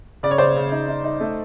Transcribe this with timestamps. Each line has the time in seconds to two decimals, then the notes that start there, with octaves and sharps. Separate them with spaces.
0.23 C#3 D5
0.31 C#5
0.38 C#3 C5 D5
0.56 C#3
0.72 D#4
0.89 D#4
1.04 D#4
1.20 A3